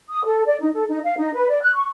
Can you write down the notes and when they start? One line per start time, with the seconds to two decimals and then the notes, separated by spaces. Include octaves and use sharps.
0.11 D#6
0.25 A4
0.47 D5
0.61 D#4
0.74 A4
0.89 D#4
1.04 F5
1.18 D#4
1.35 B4
1.49 D5
1.62 F#6
1.75 C#6